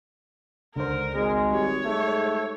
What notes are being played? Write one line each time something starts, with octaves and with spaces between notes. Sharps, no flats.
C#2 D3 A#4 C5
G#1 G#3
G3 C#5
G#2 A3